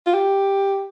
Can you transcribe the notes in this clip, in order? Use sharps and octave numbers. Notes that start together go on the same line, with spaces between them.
F4
G4